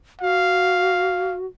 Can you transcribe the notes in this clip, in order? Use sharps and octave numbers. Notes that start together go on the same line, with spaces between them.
F#4 F5